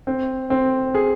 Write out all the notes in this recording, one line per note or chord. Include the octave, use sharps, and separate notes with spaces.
C4
C4
G#4